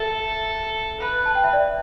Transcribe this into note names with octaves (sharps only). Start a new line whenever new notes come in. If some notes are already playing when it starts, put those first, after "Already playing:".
Already playing: A4 E5
B4
A5
G5
E5
D5